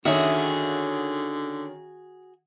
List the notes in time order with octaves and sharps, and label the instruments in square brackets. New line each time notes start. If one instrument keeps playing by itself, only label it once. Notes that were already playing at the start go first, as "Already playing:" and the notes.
[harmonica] D3 [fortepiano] D#3 C#4 [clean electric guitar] F#4 G#4 [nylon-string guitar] E5